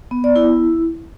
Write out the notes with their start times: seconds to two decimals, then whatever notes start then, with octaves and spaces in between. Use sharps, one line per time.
0.11 B3
0.24 D5
0.36 E4